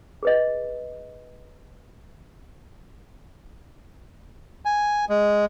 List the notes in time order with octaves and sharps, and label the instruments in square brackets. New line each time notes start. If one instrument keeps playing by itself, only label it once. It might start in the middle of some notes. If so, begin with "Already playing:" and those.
[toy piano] G#4 B4 D#5
[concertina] G#5
G#3